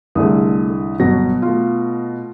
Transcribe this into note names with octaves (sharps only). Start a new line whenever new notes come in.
C2 D3 G#3 A3 D#6
G1 B2 F#3 A#6
A3 F4